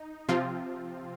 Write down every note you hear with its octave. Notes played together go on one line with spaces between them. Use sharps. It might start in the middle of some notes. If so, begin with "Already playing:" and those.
Already playing: D#4
C3 F3 C4 F4